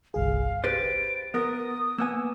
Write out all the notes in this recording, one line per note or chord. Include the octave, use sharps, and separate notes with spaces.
G1 C2 G#4 F5
G4 B4 C5 A6 D7
B3 A#4 D#6
A#3 B3 G#5 E6